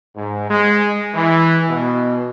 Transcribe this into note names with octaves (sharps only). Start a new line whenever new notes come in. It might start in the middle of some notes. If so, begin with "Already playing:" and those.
G#2
G#3
E3
B2